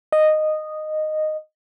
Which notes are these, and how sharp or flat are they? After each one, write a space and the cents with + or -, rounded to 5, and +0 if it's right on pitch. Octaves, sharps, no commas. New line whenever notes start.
D#5 -10